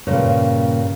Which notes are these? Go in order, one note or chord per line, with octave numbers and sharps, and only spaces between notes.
G2 A#2 C#3